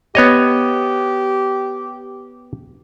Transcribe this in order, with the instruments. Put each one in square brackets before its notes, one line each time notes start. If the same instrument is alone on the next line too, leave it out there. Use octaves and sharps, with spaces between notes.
[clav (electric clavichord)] B3 C#5 D#5 [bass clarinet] G4